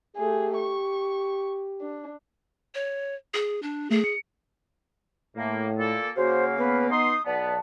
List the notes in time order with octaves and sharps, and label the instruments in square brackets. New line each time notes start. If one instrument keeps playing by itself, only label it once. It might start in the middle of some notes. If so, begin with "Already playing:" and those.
[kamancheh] A3 G#4 [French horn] G4
[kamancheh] C#6
D4
[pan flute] C#5
G#4
D4
[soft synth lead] A3 [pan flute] G#4
[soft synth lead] C#7
[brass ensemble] A2 [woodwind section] A#3
[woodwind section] A#2 A#3 A4
[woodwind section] C#3 A#3 F5 [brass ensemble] F#4 [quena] C5
[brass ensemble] B3 [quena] B4
[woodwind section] D#4 C6 [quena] D#6
[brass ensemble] B1 A5 [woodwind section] B3 [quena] D5